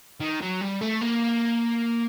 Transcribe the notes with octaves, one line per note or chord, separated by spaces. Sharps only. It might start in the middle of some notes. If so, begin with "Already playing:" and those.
D#3
F#3
G3
A3
A#3